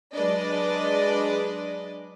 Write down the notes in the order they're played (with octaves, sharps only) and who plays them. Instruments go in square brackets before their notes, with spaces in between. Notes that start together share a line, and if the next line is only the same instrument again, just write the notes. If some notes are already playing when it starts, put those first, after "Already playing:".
[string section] F#3 G#3 D4 B4 D5 D#5